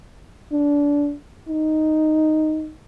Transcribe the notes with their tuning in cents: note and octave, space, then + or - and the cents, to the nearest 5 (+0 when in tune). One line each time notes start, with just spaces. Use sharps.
D4 -20
D#4 +0